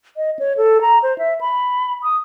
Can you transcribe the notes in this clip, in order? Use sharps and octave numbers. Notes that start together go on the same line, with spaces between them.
D#5
C#5
A4
A#5
C5
E5
B5
D#6